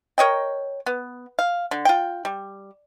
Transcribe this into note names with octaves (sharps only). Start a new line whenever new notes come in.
A#4 C#5 D#5 G5
B3
F5
D3
F4 G5
G3